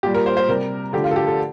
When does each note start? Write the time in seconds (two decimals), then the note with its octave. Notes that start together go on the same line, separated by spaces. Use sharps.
0.03 A#2 G3 G4
0.15 A#4
0.26 C5
0.37 C5
0.48 C3 G3 A#4
0.93 D3 F3 A3 G4
1.04 F4
1.11 A4
1.16 G4
1.27 A4